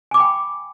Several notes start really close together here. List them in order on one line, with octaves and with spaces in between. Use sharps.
G#5 D6 B5 G5